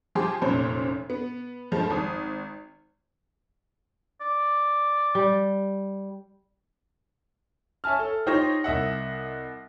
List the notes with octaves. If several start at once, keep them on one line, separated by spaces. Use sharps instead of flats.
F3 G4 G#4 C6
F1 F#2 A#2 C5 C#5
B3
G2 F3 G#3 A3
G#1 D#6
D5
G3
C#5 E5 G#5 A5 F6
A4
D#4 F4 G4 C5 C#5 D#5
C2 D#5 E5 F#5